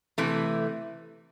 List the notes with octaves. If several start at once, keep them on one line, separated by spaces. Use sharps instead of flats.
C3 E3 A3